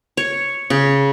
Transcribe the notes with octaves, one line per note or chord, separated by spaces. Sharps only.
C#5
C#3